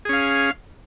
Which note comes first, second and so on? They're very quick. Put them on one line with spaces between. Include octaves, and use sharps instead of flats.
G#4 C#4 F5